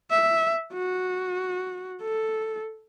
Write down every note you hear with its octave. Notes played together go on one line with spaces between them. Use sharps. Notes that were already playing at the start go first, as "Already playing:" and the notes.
E5
F#4
A4